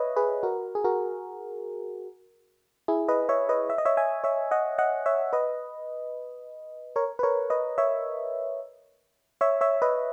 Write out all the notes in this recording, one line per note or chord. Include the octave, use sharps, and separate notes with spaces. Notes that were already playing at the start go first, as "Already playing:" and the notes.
Already playing: B4 C#5 D#5 E5
G#4 B4
F#4 A#4
G#4
F#4 A#4
E4 G#4
B4 D#5
C#5 E5
B4 D#5
E5
D#5
C#5 E5
E5 G#5
C#5 E5
D#5 F#5
D#5 F#5
C#5 E5
B4 D#5
A#4 C#5
B4
A#4 C#5
B4 D#5
C#5 E5
C#5 E5
C#5 E5
B4 D#5